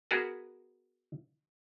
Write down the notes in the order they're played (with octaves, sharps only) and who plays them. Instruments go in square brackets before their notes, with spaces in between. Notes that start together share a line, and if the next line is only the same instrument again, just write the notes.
[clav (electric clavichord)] B3 F#4 G#4 A#4 B4